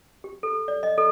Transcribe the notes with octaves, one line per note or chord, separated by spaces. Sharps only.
G4
A4
D5
D#5
A4